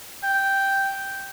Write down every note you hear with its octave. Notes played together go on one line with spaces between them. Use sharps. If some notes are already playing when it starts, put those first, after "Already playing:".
G5